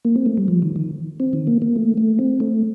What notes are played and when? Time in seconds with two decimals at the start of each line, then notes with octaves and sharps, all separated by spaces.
0.05 A#3
0.16 C4
0.26 A3
0.38 G3
0.48 F3
0.62 D#3
0.76 D#3
1.20 C4
1.33 D#3
1.47 A#3
1.62 A#3
1.76 A3
1.97 A3
2.19 C4
2.40 A3